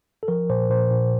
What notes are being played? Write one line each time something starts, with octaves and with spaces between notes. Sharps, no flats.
A4
F3 A#4
A#2 C5
A#2 C5
A#2